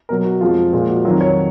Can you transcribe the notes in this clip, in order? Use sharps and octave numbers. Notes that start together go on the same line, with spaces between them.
B2 F#3 A#4
F#4
F2 F3 G#3 F4
A#2 F3 G#3 F4
F#4
F2 D#3 F#3 F4
C#5